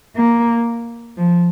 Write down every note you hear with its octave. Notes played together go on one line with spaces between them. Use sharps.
A#3
F3